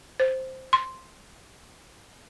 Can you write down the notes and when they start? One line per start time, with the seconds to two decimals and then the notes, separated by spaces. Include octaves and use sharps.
0.20 C5
0.73 C6